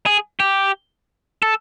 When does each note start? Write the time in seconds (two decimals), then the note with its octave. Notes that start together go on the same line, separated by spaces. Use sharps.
0.06 G#4
0.40 G4
1.42 A4